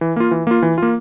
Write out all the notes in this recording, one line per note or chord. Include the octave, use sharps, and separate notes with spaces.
E3
A#3 F4
E3
A#3 F4
E3
A#3 F4